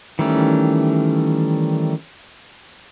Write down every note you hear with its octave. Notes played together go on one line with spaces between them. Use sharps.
D#3 E3 G3 A3 C#4